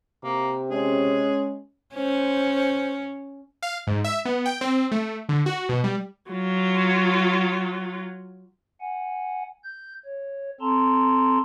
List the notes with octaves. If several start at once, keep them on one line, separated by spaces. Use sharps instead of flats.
C3 A#3
G#3 C#4 G#4
C#4 C5
F5
G#2
E5
B3
G5
C4
A3
D3
F#4
B2
G3
F#3 F4
F#5 G#5
G6
C#5
C4 A4 A5 A#5 C6